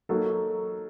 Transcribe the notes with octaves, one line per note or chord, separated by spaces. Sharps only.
F#3 A#3 D#4 F#4 A4